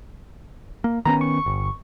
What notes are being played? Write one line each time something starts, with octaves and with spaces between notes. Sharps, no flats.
A#3
D#3 B3 C#4 A#5
C#6
G1